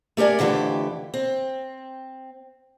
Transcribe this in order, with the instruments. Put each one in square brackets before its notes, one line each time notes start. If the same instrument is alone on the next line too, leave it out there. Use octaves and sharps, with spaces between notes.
[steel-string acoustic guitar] A3 G4 A#4 D5 G#5
F2 D3 E3 A3 G4
C4